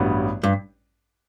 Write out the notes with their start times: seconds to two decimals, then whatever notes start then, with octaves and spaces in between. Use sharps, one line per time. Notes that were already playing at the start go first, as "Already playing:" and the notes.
Already playing: A1 G2 F#3 B3
0.43 G2